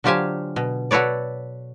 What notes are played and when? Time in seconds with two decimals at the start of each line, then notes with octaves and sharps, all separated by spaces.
0.04 D3 F#3 F4 G4 C5 G#5
0.56 B2
0.91 F#4 A4 B4 C#5 D5